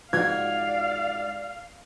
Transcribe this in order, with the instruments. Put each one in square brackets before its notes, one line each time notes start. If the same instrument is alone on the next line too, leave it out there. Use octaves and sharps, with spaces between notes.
[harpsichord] G#2 F4 F#4 [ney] D5 [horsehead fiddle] F5 [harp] G#6